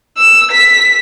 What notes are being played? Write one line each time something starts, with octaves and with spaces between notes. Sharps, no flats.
E6
B6